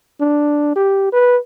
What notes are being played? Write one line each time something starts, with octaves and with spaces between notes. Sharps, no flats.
D4
G4
B4